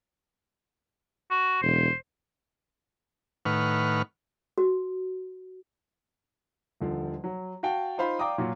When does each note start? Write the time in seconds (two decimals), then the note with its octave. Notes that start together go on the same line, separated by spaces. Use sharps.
1.31 F#4
1.63 E1 C5
3.45 A2 D#3 B4 F#5 C#6 F6
4.58 F#4
6.81 D#1 D3 F3
7.24 F#3
7.63 F#4 F5 G5 A5
7.98 D#4 F4 C5 F5 B5
8.19 D5 F5 G5 A#5 D6 D#6
8.38 A#2 F#3 F4